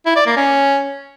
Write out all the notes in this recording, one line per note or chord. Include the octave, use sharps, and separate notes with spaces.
E4
D5
A#3
C#4